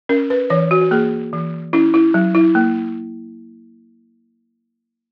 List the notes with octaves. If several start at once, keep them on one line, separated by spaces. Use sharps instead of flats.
C#4 A#4
B4
E3 C#5
F#4
F#4
A#3 G#4
E3
C#4 E4
E4
F#3
E4
A#3